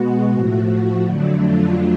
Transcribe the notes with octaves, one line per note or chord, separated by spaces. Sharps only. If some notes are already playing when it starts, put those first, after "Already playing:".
Already playing: B2 G#3 B3 F#4
A2 F3 A3
F2 D3 F#3 A3 D4
F4